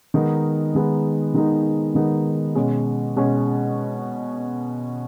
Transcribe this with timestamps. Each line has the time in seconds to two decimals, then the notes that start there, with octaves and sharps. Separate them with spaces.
0.14 D#3 G#3 B3 D#4
0.75 D#3 G#3 B3 D#4
1.34 D#3 G#3 B3 D#4
1.95 D#3 G#3 B3 D#4
2.55 B2 G#3 C#4
3.16 B2 G#3 C#4